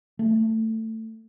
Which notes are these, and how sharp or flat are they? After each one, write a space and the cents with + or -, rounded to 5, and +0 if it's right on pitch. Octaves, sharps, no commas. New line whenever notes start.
A3 +20